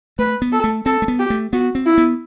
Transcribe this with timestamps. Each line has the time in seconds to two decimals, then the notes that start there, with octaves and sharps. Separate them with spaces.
0.19 A3 B4
0.42 B3
0.52 A4
0.64 A3
0.86 C4 A4
1.02 A3
1.08 B3
1.19 G4
1.30 A3
1.53 B3 F#4
1.75 C4
1.86 E4
1.98 B3